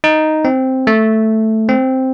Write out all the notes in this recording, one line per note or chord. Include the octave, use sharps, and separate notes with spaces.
D#4
C4
A3
C4